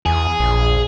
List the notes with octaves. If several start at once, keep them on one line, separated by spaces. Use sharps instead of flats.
E2 G#4
A#1